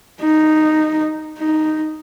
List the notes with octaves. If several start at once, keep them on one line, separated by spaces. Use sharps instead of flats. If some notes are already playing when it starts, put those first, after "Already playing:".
D#4
D#4